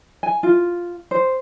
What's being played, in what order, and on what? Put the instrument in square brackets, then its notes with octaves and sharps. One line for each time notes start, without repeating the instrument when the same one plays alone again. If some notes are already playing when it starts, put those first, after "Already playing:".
[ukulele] G#5
F4
C5